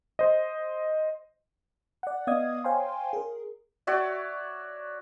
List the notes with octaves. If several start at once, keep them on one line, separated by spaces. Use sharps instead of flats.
C5 D#5
D5 F#5
B3 D5 D#5 F5 D#6 G#6
C5 C#5 F5 G5 G#5 C6
G#4 A#4
F#4 C#5 D5 E5